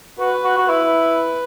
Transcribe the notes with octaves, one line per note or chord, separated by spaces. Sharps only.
F#4 B4
F#4
F#4
E4 B4